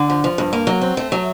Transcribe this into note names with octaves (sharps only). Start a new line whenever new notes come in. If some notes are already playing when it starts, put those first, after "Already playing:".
Already playing: D3
F3
F3
G2
A#3
F#3
C4
A3
F#3